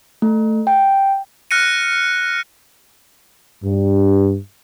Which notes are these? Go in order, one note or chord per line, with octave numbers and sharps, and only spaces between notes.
A3
G5
F6 F#6 A#6 C#7 D#7
G2